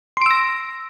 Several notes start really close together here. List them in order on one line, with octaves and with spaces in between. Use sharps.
C6 D7 E6 A#6